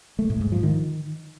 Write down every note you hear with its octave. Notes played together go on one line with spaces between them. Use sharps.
A3
A2
G#2
F3
D#3